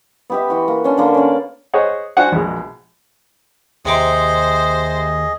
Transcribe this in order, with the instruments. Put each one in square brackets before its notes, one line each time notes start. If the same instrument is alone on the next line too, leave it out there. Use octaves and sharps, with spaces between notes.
[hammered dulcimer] B3 G4 E5
E3 F#4 C6
A#3
C#4 D4 C#5 C6
D3 A#3
C#4 D5
[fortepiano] G#4 C5 C#5 D#5 F#5
D4 F#4 C5 F5 F#5 G#5
A#1 B2 G#3
[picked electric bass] D#2 [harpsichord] C3 D#4 D6 [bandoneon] G#4 D#5 [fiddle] C5